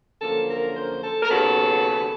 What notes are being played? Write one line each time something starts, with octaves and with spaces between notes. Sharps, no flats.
F#2 D3 F3 A#3 A4
A#4
C5
A4
A#4
D#2 C#3 F#3 B3 A4